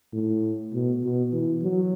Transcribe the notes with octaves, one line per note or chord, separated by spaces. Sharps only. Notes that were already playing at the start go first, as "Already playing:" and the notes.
A2
B2
B2
E3
F#3